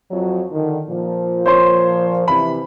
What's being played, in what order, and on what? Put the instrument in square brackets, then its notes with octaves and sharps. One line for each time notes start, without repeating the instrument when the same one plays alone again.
[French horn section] F2 F3 F#3
D3 D#3
A#2 F3
[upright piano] C5 C#5 C6
[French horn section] C3 E3 [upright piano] B5